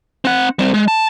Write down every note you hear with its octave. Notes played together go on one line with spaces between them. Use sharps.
C4 F#5
G3 C4
G#3
A5